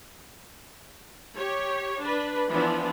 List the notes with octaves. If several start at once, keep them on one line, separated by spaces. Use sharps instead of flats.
G4 C#5
D4 B4
E3 F3 B3 D4